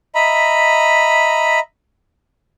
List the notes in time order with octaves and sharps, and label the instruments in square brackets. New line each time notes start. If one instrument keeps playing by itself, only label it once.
[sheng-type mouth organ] D#5 E5 A#5 B5